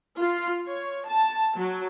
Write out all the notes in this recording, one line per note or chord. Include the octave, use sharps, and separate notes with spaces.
F4
C#5
A5
F#3